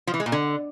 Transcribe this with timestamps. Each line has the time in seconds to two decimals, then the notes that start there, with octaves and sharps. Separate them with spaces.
0.07 F3
0.14 E3
0.20 G#3
0.26 A#2
0.32 D3